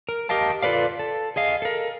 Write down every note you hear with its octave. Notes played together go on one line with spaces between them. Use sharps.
A#4
G4 A#4 D#5 F5 A5
F4 A4 B4 D5 F5
A4
G#4 D#5 F5
A4 A#4